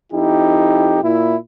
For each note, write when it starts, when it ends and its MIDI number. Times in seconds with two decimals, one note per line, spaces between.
0.12 0.98 41
0.12 0.98 63
0.12 0.98 64
0.12 0.98 67
1.03 1.35 46
1.03 1.35 64